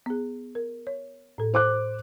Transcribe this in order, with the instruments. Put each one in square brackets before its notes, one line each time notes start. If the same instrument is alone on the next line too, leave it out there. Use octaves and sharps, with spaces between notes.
[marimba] B3 G#4
A#4
C#5
A2 A4
[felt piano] C5 D6 F#6